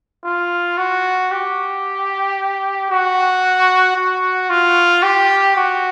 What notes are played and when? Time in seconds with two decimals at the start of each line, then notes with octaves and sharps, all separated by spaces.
0.24 F4
0.77 F#4
1.31 G4
2.90 F#4
3.96 F#4
4.49 F4
5.02 G4
5.55 F#4